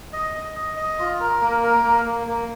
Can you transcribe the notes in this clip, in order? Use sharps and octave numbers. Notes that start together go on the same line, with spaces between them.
D#5
D#5
D#5
D#5
F4
A#4
A#3
A#4
A#3
A#3
A#3